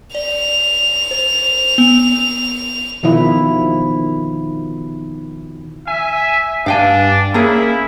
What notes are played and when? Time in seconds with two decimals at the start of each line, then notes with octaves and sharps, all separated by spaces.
0.15 D5 F7
1.11 C5
1.78 B3
3.03 B2 D#3 F3 E4
5.87 E5 G#5
6.66 G2 D4 F5 G5 G#5
7.34 A#3 C#4 E4 G#4 A#4